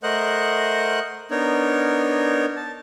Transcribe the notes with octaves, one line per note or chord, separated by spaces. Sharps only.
A3 A#4 C5 D#5 F#5 F#6
B3 D4 D#4 A#4 C#5
A5